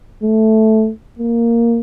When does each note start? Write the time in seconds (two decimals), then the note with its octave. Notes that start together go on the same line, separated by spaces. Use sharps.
0.23 A3
1.19 A#3